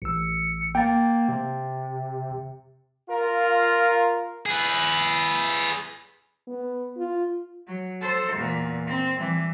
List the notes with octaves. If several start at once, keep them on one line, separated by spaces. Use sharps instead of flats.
A1 E6 C#7
A#3 G5 A6
C3
F4 A#4
G#4 B4
B3
F4
F#3
A4 C5
E2 A#2
C4
E3 G3